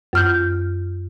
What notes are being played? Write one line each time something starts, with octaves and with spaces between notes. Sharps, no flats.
F#2 F6 G6